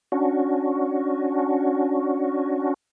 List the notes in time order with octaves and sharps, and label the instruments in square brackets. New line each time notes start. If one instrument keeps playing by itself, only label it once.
[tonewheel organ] C#4 D4 F#4